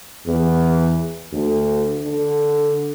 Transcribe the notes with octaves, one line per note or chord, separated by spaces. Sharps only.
E2
D2
D3